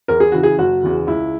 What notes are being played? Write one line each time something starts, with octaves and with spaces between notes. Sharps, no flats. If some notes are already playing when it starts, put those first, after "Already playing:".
E2 A#4
G#4
C#3 E3 F#4
G#4
F#1 F#4
E2 C#3 E3
C#2 E4